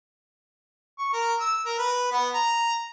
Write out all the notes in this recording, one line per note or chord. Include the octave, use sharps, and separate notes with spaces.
C#6
A#4
E6
A#4
B4
B3
A#5